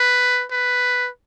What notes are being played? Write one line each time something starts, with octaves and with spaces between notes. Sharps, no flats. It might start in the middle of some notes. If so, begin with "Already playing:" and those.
Already playing: B4
B4